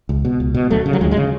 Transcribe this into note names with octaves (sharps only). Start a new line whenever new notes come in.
C#2
B2
C#2
B2
D2 F#3 A3
C#3
F#3
D2 F3 G#3
F3 G#3
C#3